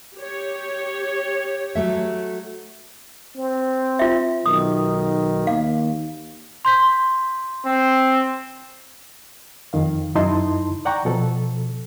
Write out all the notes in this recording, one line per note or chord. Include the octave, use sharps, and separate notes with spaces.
G4 C#5
F#3 A3 E5
C4
F4 E5
B1 D#3 D#6
D#2 F5
C6 G6 B6
C4
F2 D#3 F5
F#2 D#4 E4 D#5 A5 C6
D5 F#5 G5 A#5 C#6
B2 F3 A4